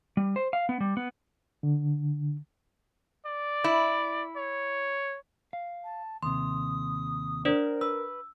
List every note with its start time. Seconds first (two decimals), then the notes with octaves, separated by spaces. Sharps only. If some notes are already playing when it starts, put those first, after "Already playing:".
0.17 G3
0.36 C5
0.53 F5
0.69 B3
0.80 G3
0.97 B3
1.63 D3
3.26 D5
3.64 E4
4.36 C#5
5.53 F5
5.84 A5
6.23 D#2 C3 C6 D#6
7.45 D4 A#4 C5 D5
7.81 B4 E6